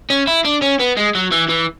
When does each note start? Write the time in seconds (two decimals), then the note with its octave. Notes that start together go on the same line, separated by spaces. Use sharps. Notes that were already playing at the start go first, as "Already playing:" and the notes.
0.10 C#4
0.27 E4
0.45 D4
0.62 C#4
0.80 B3
0.97 G#3
1.15 F#3
1.32 E3
1.49 E3